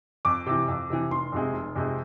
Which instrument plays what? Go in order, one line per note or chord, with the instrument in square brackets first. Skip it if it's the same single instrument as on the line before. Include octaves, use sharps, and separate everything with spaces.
[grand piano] F2 D6
C3 E3
F2
C3 E3
F1 C6
F2 C3 G#3
F1
F2 C3 G#3